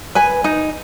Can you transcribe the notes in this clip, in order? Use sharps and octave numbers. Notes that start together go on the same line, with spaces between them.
B4 G#5
D#4